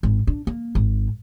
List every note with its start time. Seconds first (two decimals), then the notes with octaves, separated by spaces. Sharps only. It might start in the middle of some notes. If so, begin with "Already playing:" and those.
0.03 G#1
0.27 D4
0.47 A#3
0.75 G#1